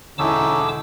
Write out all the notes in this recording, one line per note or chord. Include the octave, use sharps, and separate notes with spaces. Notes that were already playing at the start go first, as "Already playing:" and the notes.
E1 D3 C#4 D#4 E4 A5 D6 E6